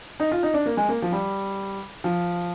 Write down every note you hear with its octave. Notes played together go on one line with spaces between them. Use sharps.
D#4
F4
D#4
D4
A#3
G#3
A#3
F3
G3
F3